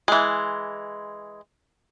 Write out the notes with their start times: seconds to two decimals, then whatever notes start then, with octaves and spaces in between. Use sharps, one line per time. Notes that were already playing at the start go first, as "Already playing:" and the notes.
0.08 E3 G#3